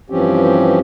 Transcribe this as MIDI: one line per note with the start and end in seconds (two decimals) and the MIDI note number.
0.10 0.79 43
0.10 0.79 52
0.10 0.79 53
0.10 0.79 60
0.10 0.79 61
0.10 0.79 67